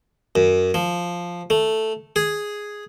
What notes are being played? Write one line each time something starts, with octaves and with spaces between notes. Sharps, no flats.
F#2
F3
A3
G#4